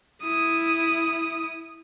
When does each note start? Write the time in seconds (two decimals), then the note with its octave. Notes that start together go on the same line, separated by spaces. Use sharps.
0.22 E4 D#6